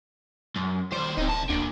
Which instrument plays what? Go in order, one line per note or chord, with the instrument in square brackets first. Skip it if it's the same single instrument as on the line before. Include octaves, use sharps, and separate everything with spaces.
[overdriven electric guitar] F#2
[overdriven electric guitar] D#2 C5 [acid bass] G3
[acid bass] D1 [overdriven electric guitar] C4 D#4
[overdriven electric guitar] C2 A5
[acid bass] D2 [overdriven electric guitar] A#3 D4